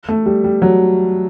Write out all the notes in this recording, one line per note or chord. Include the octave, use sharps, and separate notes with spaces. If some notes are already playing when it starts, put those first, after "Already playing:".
A3
G3
G3
F#3